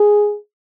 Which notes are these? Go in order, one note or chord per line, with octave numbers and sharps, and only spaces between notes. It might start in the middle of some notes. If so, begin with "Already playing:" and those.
Already playing: G#4